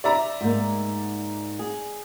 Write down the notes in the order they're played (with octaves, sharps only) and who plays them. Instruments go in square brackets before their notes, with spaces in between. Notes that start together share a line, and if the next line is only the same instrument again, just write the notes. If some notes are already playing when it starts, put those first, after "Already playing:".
[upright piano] D5 E5 A#5
[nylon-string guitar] G#2 A#3
G#4